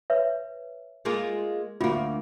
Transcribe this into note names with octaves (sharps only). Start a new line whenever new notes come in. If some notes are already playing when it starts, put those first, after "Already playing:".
B4 C#5 E5
G#3 A#3 F4
D2 A#3 F4